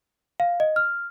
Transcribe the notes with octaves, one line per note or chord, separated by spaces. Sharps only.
F5
D#5
F6